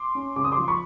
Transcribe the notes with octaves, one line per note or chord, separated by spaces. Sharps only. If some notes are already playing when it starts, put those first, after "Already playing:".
Already playing: C6 D6
C#4
C#3 D6
D#6
C6 D6
F3
B5 C#6